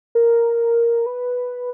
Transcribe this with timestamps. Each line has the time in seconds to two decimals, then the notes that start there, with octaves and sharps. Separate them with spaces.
0.15 A#4
1.06 B4